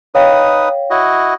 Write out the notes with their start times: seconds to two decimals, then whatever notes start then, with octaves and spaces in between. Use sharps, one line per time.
0.15 D#4 B4 C#5 F5 G5 D#6
0.90 E4 F#4 D#5